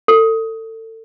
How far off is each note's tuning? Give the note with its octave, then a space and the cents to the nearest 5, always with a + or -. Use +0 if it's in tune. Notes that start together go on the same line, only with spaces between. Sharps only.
A4 +30